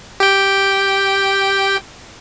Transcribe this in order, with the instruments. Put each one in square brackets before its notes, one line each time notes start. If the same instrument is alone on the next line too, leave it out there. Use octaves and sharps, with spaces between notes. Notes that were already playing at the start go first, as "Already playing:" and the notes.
[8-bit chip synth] G4 G5